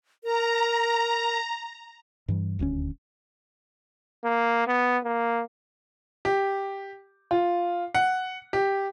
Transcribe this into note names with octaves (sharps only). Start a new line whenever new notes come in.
A#4 A#5
G2 E3 G3
D#1 D2 A3 C#4
A#3
B3
A#3
G4
F4
F#5
G4